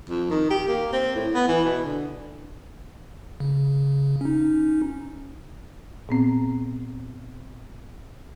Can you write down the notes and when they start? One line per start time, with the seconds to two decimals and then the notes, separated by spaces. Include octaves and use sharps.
0.10 F2
0.30 D#3
0.50 G4
0.68 A#3
0.92 C4
1.15 A2
1.34 B3
1.48 E3
1.65 B2
1.84 D3
3.40 C#3
4.21 C#4 D#4
6.09 A#2 B3 C4